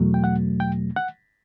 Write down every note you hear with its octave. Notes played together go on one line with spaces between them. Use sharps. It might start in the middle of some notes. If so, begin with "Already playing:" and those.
Already playing: E2 B2 F#3 A3
G5
F#5
G5
F#5